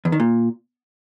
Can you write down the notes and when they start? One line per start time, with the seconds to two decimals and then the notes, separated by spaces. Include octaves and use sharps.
0.05 E2
0.12 D#3
0.20 A#2